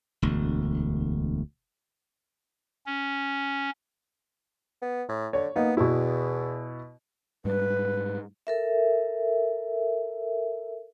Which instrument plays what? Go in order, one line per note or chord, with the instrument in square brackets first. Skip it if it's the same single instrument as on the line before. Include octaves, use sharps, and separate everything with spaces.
[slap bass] E1 D2
[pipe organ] C#4
[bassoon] B3
A2
[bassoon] D3 [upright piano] C#5
[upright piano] A#3 D#4 [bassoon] B3
[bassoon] E2 [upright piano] B2 E4
[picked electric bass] G#2 G3 [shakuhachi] B4
[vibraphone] A4 A#4 E5